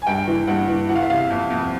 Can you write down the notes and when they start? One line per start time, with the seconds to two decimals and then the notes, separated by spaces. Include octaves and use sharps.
0.02 G#5
0.07 G2 G5
0.28 E3
0.47 G2 F#5
0.68 E3
0.89 E3 F#5
0.96 F5
1.02 E5
1.10 C3 F5
1.30 F2
1.50 F2